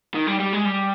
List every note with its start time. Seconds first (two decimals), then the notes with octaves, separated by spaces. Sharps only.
0.14 D#3
0.27 G3
0.40 G3
0.53 G#3
0.65 G3